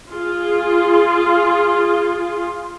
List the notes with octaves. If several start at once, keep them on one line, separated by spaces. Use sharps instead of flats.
F4 G#4